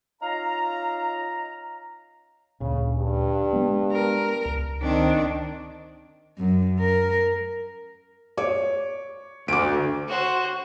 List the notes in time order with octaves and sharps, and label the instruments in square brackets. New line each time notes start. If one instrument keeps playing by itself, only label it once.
[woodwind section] C#4 D#4 F4 F5 A#5
[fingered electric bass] D2 A#2 [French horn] C#3
[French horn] G2
[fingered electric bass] G#3 B3
[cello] A#4
[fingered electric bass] C#2
[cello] D#3 D4 [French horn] C4
[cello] F#2
A#4
[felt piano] C#5 D6
[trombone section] D2 [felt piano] D6 D7
[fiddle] F#4 C5